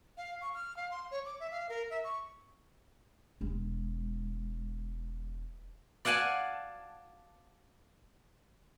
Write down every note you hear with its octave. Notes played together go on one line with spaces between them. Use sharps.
F5
C#6
F6
F5
C6
C#5
D6
E5
F5
A#4
E5
C#6
E1 G#3
D5 F5 F#5 G#5 A5